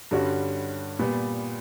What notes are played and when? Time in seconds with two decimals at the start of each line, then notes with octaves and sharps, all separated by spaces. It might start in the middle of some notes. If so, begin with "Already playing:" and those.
0.11 G2 D3 G3 C#4 F#4
0.99 A#2 G3 B3